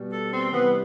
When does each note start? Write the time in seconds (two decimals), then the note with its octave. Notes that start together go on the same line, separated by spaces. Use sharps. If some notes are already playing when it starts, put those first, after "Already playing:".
Already playing: B2 G3
0.10 A4
0.31 C4
0.52 C3 E3 G3 B3